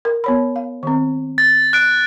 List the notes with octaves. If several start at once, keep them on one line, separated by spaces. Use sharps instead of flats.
A#4
B3 C#5 B5
F5
D#3 C4
A6
F#6 D7